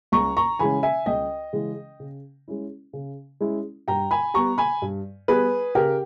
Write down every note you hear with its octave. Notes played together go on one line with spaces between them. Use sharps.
C#2 A#5 C#6
A#5 C#6
C#3 E3 G#3 C#4 G#5 B5
E5 G#5
C#2 D#5 G5
C#3 E3 G#3 C#4
C#3
G#3 C#4 E4
C#3
G#3 C#4 E4
G2 G5 A#5
G#5 B5
G3 B3 A#5 C#6
G#5 B5
G2
G3 B3 G#4 B4
C#3 G4 A#4